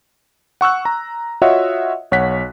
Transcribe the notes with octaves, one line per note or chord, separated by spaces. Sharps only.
F#5 C#6 E6 F#6
A#5
F4 F#4 C#5 D#5 E5 F#5
B1 C#5 F#5 F#6 B6